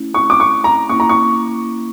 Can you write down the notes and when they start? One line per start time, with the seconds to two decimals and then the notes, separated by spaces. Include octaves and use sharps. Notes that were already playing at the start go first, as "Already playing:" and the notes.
Already playing: A3 C#4 E4
0.14 C#6
0.30 D6
0.40 C#6
0.64 A#5
0.89 A#3 C#4 E4 C#6
1.00 A#5
1.09 C#6